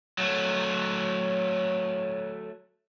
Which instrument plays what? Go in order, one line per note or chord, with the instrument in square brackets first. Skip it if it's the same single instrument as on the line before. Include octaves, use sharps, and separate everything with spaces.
[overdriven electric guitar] F#3 A3